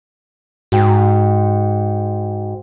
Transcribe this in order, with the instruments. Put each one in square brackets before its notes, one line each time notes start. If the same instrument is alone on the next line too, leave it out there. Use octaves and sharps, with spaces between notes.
[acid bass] G#2 [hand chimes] F#4 G5